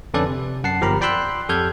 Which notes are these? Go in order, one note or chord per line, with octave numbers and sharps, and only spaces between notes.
F2 D3 C#4 A4 B4 D5
C3
F#2 F#5 A5 C7
G1 F3 G4 A#4 A#5 B5
D5 G5 B5 C6 E6 F#6
F2 G4 A4 F6 G6 G#6